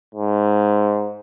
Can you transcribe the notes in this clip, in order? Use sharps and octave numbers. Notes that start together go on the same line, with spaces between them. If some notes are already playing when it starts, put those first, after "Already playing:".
G#2